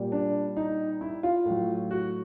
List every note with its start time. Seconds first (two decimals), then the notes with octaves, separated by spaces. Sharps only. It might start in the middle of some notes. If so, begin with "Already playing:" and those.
Already playing: A#2 G3
0.12 D4
0.57 D#4
1.01 E4
1.23 F4
1.45 A2
1.50 F#3
1.91 F#4